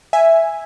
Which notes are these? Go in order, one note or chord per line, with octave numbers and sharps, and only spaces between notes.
E5 G#5